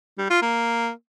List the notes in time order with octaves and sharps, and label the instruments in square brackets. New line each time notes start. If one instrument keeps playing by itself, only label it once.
[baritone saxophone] G3
F4
A#3